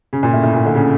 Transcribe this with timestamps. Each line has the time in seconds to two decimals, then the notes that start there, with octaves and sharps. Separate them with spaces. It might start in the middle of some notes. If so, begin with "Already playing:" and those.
0.13 C#3
0.23 A#2
0.33 A2
0.43 A2
0.54 A#2
0.66 D3
0.75 C#3